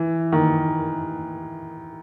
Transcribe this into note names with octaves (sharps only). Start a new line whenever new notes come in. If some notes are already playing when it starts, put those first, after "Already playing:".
Already playing: E3
D#3